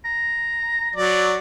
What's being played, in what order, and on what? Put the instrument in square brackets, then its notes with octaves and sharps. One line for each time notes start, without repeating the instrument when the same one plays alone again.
[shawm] A#5
[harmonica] F#3 D5